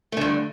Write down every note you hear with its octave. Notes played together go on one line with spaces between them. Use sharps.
G2 D3 A3